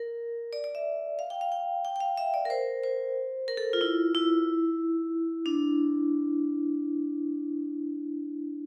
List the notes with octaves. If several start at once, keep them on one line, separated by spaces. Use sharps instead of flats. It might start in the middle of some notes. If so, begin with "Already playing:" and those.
Already playing: A#4
D5
D5
E5
F5
G5
F5
G5
G5
G5
F5
E5
D5
A#4
C5
C5
A#4
A4
F4
E4
E4
D4